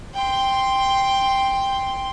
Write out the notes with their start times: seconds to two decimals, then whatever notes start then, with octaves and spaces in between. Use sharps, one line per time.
0.14 G5 C6